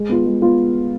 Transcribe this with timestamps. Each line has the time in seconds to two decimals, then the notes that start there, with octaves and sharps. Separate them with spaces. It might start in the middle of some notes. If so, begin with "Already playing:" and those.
Already playing: G#3
0.09 B3 F4
0.26 G#3
0.42 B3 F4